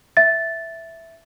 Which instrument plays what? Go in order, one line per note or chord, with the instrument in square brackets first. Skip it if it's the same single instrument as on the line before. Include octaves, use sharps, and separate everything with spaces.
[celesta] E5 A6